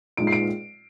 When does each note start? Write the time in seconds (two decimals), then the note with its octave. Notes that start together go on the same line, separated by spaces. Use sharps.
0.17 A#2 G#3 D#4 D7
0.27 C7
0.32 D7